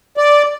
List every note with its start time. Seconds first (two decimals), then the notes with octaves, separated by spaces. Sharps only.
0.17 D5